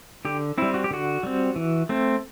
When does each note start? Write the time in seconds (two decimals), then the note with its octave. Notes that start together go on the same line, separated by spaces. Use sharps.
0.25 D3 G4
0.58 G3 C4 E4
0.74 F#4
0.84 G4
0.91 D3 F#4
1.23 G3 C4
1.56 E3
1.89 A3 C4